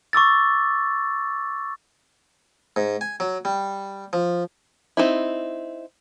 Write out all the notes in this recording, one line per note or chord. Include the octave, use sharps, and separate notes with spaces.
C#6 D6 E6 A6
G#2
G#5
F#3
G3
F3
C4 D#4 E4